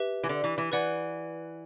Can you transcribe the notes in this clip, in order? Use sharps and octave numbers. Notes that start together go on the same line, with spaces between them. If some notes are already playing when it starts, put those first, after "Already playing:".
Already playing: G4 B4 E5
E3
D3
E3
E3
E3 B4 D5 F#5